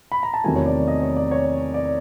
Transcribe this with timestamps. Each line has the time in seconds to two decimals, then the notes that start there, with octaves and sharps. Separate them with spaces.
0.12 B5
0.23 A#5
0.34 A5
0.44 E2 C3 D#3 F#3 A3 G#5
0.56 C#5
0.66 D5
0.88 D#5
1.02 C#5
1.17 D5
1.31 C#5
1.74 D5